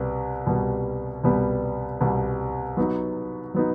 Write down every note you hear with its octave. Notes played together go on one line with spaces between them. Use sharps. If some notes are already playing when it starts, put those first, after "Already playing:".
Already playing: C2 B2 G3 B3
C2 B2 G3 B3
C2 B2 G3 B3
C2 B2 G3 B3
F#3 B3 D#4
F#3 B3 D#4